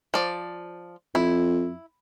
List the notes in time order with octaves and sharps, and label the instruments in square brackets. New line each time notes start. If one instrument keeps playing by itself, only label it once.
[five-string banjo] F3 D5
[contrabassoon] F2 [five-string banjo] E4